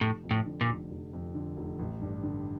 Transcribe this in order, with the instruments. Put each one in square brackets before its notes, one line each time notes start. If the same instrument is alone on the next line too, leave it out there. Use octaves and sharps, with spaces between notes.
[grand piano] F1 [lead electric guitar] A2
[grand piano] F2
[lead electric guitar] A2
[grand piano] D3
[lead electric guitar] A#2
[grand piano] F1
F1
F2
D3
F1
A1
G2
D3